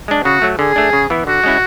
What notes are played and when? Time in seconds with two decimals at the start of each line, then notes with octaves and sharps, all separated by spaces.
0.08 G#3 D4
0.25 C#3 F#4
0.42 F#3 A3
0.59 D3 G#4
0.76 A3 D4
0.93 C#3
1.10 E3 B3 E4
1.27 D3 F#4
1.44 G#3 C#4 E4